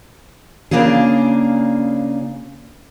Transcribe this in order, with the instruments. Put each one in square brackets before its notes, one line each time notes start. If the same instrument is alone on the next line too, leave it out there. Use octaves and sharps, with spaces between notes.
[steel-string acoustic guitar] C#3 A#3 D4 F4 G#4